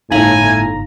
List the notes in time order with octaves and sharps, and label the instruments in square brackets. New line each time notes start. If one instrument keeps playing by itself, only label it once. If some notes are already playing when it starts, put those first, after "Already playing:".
[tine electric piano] G1 A#5 A#6 [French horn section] A2 [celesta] D#4 F5 F#7 [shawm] G#5